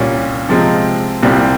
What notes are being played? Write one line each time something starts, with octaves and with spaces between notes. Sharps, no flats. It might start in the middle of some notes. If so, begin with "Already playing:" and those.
Already playing: C2 A#2 G3 C#4
C3 F3 G#3 C4
C2 A#2 G3 C4